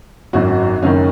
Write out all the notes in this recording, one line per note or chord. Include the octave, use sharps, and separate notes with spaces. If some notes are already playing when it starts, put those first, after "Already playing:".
G#1 F#2 F#3 C#4 F#4
F#1 F#2 D#3 C#4